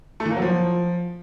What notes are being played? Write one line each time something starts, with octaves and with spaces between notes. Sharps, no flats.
A3
E3
A#3
F#3
F3